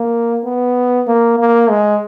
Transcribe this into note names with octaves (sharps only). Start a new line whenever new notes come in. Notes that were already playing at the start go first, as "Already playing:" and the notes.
Already playing: A#3
B3
A#3
A#3
G#3